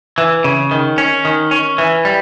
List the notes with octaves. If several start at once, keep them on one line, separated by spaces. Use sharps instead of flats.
E3
C#3
D#3
C#4
D#3
C#4
E3
G3